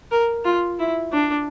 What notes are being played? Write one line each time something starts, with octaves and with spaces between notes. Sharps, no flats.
A#4
F4
E4
D4